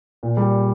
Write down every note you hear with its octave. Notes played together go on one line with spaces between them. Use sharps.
A#2
G3